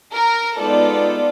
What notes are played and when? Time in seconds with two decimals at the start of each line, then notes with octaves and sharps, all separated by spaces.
0.15 A#4
0.58 G#3 B3 D#4 F4 A4 D5